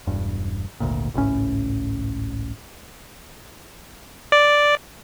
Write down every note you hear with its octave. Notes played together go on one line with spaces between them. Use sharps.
E1 G2
G#1 D2 A#2
G#1 C#2 A2 C#4
D5